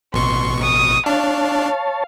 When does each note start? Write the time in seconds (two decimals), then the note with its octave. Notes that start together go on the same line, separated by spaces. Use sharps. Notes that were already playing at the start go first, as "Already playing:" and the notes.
0.14 A1 B2 C6 C#6
0.62 D#6
1.06 D4 C#5 F5 A5